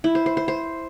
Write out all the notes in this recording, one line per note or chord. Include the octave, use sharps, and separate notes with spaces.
E4
C5
C5
C5
C5